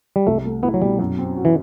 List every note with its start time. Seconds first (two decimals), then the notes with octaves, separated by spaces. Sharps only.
0.16 G3
0.27 C2 A3
0.45 A3
0.63 B3 E4
0.74 F#3
0.82 B2 G3
0.99 F#2
1.18 C4
1.37 F#4
1.45 E3